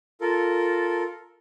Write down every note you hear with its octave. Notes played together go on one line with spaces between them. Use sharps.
F4 A4 A#4